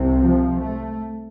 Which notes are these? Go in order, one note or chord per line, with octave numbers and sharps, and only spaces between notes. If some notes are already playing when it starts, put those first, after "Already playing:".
Already playing: C2 C3
F3
A3